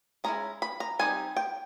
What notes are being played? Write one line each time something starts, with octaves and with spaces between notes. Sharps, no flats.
G#3 C#4 E4 A#5
B5
A#5
G3 C4 D#4 G#5
G5